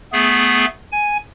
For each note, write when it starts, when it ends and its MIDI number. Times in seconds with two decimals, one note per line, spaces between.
0.12 0.65 57
0.12 0.65 59
0.12 0.65 68
0.92 1.17 80